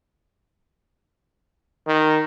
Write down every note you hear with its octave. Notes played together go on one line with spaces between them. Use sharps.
D#3